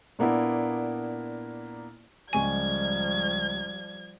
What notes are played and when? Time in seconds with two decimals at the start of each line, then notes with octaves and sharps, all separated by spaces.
0.19 A#2 A#3 B3 D4 E4
2.33 C#2 F3 G3 G#3 G#5 C#6 G#6